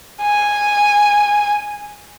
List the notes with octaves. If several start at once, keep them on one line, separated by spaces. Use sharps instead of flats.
G#5